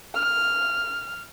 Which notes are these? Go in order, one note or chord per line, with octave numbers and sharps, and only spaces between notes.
F6